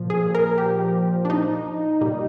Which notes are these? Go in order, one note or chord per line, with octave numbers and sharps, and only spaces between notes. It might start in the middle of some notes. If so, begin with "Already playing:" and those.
Already playing: A#2 F3
G#4
A#4
G4
D4
D#4
A#2 G3